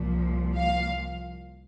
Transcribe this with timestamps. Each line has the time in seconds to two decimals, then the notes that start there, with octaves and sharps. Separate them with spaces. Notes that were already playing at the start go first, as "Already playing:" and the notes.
Already playing: C2 A#2 F3
0.57 F5